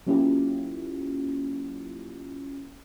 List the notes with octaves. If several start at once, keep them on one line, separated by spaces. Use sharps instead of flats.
F#3 A#3 C#4 E4 F4 G4